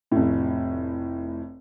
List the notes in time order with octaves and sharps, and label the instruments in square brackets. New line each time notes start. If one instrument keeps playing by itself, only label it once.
[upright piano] F1 A2